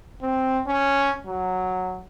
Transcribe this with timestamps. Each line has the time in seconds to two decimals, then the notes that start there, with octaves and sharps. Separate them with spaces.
0.22 C4
0.67 C#4
1.27 F#3